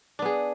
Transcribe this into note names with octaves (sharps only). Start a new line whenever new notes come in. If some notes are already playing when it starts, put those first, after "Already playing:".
B3 D4 G#4